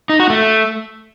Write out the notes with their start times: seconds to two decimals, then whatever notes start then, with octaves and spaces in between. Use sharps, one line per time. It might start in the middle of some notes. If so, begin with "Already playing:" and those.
0.10 D#4
0.20 F#4
0.30 A3